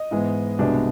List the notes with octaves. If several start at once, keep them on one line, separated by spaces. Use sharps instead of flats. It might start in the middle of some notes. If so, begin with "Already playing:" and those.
Already playing: D#5
G#2 E3 G#3 B3 E4
C2 B2 G#3 B3 D4